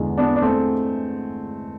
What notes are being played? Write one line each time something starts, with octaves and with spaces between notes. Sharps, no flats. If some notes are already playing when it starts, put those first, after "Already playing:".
Already playing: E2 D3 G#3
B3 D4
D4
A3 C4